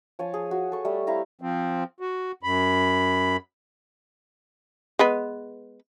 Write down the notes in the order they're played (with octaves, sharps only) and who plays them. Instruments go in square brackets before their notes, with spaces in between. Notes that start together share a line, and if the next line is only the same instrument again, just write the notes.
[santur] F3 C#5 G#5 A5
G#4
F#4
A4 C#6
G3 A3
C4 E4 F5 A#5
[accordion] F3 C4
F#4
F#2 B5
[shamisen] G#3 B3 B4